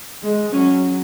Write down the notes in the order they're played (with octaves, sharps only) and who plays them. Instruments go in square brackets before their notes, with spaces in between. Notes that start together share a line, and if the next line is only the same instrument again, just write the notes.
[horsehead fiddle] G#3
[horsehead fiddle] F#3 [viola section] C#4